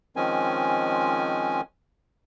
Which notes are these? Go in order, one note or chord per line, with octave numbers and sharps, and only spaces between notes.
D#3 F3 G#3 C4 C#4 G#5